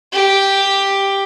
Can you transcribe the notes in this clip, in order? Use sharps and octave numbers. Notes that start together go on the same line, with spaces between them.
G4